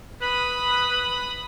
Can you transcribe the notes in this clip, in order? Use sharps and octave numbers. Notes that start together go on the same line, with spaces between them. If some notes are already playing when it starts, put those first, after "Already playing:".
B4 B5 D#6 F#7